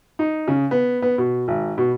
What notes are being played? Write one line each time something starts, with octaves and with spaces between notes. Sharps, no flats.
D#4
C#3
B3
B3
B2
G#1
B2